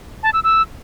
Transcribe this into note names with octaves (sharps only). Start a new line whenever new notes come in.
A5
E6
E6